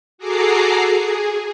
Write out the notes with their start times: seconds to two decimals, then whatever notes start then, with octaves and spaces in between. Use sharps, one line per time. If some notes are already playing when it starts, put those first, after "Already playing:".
0.18 F#4 G#4 A4 A#5 D6 C7
0.93 G#4